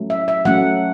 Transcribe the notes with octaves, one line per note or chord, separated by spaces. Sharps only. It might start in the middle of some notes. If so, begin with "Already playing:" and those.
Already playing: F#3 A3 C#4
E5
E5
F#3 A3 C#4 F#5